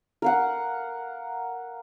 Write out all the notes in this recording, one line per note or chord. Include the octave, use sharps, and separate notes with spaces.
A#4 F5 F#5